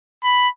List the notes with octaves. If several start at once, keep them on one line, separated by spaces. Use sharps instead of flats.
B5